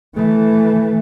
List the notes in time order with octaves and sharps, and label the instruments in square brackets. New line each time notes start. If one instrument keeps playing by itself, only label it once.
[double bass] E3 A3